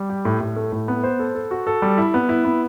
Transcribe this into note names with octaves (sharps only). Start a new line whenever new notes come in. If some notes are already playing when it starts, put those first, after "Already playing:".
Already playing: G3
G4
A2
A2
A3
A2
B3
C5
A4
A4
F#4
A4
G3
E4
B3
E4
B3